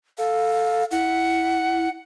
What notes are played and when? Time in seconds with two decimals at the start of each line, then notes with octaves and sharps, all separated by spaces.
0.18 A4 F5
0.91 E4 F#5